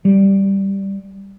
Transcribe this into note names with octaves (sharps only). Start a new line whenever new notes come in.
G3